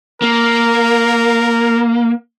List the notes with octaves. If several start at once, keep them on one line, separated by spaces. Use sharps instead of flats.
A#3 A#4